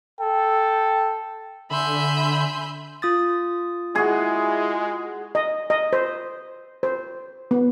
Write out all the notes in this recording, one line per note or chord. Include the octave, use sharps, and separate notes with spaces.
A4 G5
D3 E5 G#5 B5 C6 G6
F4 D#6 A6
G#3 E4 F#4 G#4
D#5
D#5
C5
C5
B3